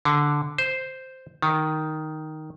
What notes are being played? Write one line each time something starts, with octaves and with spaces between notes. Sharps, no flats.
D3
C5
D#3